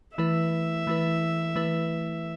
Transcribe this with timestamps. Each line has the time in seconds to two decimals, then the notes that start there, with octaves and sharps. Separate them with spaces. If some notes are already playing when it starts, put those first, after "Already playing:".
0.17 E3 A3 E4 B4 E5
0.87 E3 A3 E4 B4
1.56 E3 A3 E4 B4